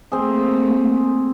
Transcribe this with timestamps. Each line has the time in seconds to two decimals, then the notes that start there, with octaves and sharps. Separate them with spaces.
0.12 A3 A#3 C4 G#4